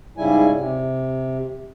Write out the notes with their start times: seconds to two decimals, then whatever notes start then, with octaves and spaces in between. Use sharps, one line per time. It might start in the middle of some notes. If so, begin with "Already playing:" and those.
0.18 G#2 C#3 G3 E4 G#5
0.56 C3